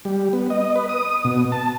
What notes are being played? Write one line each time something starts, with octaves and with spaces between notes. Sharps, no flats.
G3
B3
D#5
B4
D#6
B2
A5